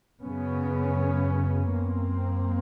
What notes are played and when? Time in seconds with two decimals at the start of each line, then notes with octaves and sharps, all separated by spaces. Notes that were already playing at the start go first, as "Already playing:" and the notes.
0.21 F#2 C#3 B3 C#4
1.73 F#2 A#3 C4